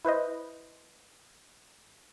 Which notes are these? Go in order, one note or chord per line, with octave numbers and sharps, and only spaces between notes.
E4 B4 C5 D#5